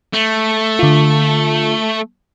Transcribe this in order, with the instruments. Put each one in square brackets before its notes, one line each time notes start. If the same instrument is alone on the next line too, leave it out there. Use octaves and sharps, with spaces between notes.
[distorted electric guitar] A3
[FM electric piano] D3 F4